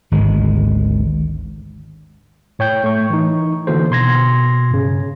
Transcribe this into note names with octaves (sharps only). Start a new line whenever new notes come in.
G#1 D2 G#3
A2 C#5 G5 G6
A3 C#6
E3 D#4
D3 E3 A#3 F#4 A4 C5
B2 C6 G#6 A#6
G2 C#3